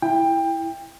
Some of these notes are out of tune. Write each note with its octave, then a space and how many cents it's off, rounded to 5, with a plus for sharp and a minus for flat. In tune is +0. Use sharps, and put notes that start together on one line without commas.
E4 +0 G5 +20